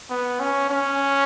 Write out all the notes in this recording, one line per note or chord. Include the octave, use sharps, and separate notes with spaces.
B3
C#4
C#4